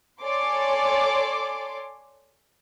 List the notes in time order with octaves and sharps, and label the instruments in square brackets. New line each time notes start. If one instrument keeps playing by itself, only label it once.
[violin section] A4 C#5 D5 G#5 C6 D6